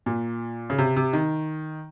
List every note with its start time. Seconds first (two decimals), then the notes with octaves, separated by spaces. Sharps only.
0.06 A#2
0.70 C#3
0.78 C3
0.96 C3
1.13 D#3